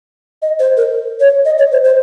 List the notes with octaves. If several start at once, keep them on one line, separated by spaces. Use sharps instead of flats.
D#5
C5
A#4
C#5
D#5
C#5
C5
C5